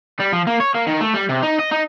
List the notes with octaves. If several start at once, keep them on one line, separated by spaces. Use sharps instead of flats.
G3
F3
A#3
C#5
A#3
D#3
A3
G3
C3
D#4
D#5
D#4